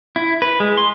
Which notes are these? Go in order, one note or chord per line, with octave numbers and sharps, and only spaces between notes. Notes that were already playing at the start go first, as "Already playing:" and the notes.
E4
B4
G#3
C6